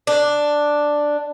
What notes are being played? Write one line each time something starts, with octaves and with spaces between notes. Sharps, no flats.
D4